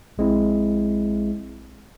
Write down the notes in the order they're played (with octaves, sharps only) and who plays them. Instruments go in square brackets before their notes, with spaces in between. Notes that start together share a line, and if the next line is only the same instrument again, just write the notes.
[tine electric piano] A#1 G#3 C4 E4